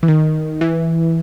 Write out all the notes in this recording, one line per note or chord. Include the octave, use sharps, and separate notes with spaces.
E3
D#3
E3